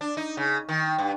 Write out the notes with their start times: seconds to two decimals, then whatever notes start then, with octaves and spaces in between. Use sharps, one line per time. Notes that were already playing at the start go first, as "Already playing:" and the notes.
0.01 D4
0.17 D#4
0.37 C#3
0.69 D#3
0.98 G2